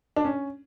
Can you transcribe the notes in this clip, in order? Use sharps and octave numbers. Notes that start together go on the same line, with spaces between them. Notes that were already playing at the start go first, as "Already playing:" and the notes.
D4
C#4